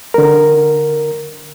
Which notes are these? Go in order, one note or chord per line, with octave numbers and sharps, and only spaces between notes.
D3 A#4